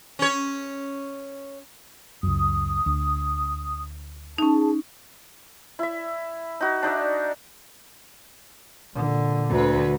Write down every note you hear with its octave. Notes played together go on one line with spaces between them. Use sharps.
C#4 C#5
C#2 F#2 D#6
D2
C#4 D#4 G#4 A5
E4 E5
D#4 F#4
D4 D#4 D5 E5
A#2 D3
D2 B4